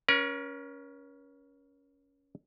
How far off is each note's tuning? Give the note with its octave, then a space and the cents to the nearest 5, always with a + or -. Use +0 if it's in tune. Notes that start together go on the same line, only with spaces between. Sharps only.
C#4 +15 A#4 +45